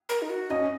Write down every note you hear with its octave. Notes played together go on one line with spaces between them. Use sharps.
A#4
D#4
F#4
C#4 D#5